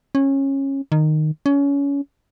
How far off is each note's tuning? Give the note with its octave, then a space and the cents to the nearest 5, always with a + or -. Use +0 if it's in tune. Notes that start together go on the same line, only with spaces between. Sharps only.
C#4 -20
D#3 -15
C#4 +25